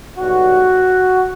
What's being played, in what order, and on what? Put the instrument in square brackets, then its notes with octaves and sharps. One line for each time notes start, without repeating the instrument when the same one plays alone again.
[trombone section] B1 B2 G3 F#4